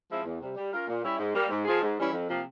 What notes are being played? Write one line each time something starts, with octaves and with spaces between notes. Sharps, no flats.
F3 G#3 C4 E4
E2
C3 G3
G3
C#4 F4 A#4
A#2
G3 C#4 E4
G#2
G3 A#3
G#2
F3 C4 F4 G#4
G#2
E3 G3 C#4 E4
F2
C3 F3 A#3